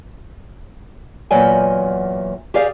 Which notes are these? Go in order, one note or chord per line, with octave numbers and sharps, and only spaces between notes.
E2 A#2 F#3 D5 G5 G#5
G4 G#4 D5 F5